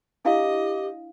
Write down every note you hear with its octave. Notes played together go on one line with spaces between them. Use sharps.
D4 E4 G4 D#5 F5